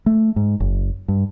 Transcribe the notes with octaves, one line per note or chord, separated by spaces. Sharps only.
A3
G#2
F#1
G2